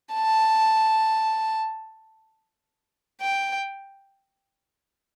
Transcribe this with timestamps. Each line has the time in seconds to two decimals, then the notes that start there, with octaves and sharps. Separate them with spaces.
0.14 A5
3.22 G5